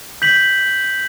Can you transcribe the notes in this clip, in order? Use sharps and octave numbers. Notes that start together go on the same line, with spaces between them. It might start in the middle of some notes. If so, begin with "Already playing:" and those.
G6 B6 F#7